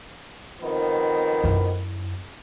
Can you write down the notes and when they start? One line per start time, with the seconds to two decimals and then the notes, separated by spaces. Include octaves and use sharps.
0.62 F2 D#3 B3
1.44 F#2 E4